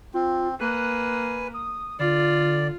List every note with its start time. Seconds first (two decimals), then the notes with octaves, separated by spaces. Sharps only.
0.14 C4 F4
0.60 A#3 B4 G#5 F#6
1.54 D#6
2.00 D3 F4 D5